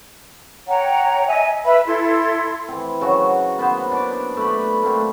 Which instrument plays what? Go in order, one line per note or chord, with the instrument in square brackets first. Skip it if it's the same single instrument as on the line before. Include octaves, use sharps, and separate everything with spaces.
[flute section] C#5 F#5 G5 A#5
D#5 E5 G#5
B4 E5 B5
E4 A4 C6
[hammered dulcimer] E3 C4
C#3 F#3 F#4 A#5
A#3 B3 B4 C5
D4 D6
A3 B4 B5
A3 A#3 C4